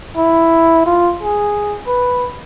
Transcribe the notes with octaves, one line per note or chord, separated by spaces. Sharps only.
E4
F4
G#4
B4